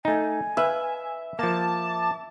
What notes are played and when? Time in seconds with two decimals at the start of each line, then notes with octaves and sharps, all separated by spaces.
0.05 A3 D#4 G#5
0.57 B4 E5 F5
1.39 F3 A#3 A5 D6